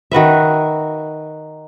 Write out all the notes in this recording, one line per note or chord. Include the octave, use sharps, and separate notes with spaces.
D#3 F#4 B4 E5